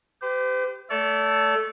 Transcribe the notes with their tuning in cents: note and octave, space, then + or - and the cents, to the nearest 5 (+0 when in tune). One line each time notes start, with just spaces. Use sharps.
G4 +0 C5 -45
A3 +0 A4 +0 D5 -40